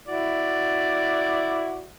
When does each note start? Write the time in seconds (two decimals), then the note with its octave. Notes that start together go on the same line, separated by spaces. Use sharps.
0.08 E4 F#4 D5